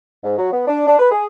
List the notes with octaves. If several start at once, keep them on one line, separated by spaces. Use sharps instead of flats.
G#2
F#3
B3
D4
D4
B4
G#4